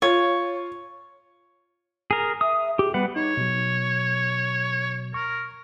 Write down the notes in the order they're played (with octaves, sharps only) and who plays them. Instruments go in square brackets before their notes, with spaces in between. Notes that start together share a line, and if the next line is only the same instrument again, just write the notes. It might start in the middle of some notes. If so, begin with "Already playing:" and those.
[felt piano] F4 [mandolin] C#5
[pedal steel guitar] G#4 A#4
[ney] E5 [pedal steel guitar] D#6
[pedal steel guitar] G4 [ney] G#4
[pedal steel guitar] G3 B4 F#5 [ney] B3
[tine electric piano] D#4 [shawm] C#5
[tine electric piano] B2 F#3
[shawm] A#4 [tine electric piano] C#6